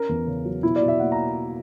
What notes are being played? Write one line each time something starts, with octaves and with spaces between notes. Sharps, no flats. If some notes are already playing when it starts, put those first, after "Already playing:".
Already playing: C#4 A#4
E2
C#3
F#3
B2 E4
D5
B2
E5
A#3 F#5
A#5